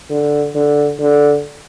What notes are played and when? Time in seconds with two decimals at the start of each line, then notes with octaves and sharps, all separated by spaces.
0.10 D3
0.55 D3
0.99 D3